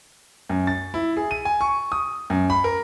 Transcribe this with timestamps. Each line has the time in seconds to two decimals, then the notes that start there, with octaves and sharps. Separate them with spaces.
0.49 F#2
0.67 A6
0.94 E4
1.17 G#4
1.31 D#7
1.45 G#5
1.61 C#6
1.92 D#6
2.30 F#2
2.50 B5
2.64 A#4